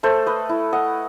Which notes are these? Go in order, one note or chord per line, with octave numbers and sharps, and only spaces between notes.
A3 A4 C5
B4 D#5
E4
D#5 F#5